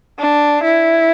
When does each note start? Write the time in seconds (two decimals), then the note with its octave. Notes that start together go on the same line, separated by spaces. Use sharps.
0.19 D4
0.63 E4